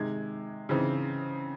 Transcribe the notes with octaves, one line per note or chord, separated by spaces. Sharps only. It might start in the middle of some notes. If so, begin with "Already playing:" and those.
Already playing: C3 D#3 G#3 G#6
C#3 E3 C4 D#4